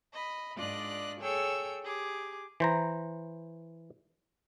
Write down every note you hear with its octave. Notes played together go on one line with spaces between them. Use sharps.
D#5 B5
G#2 D4 F4 D5 D#5 F#6
G#4 A4 C#5 G5 E6
G4 G#4 D6
E3 C5 A#5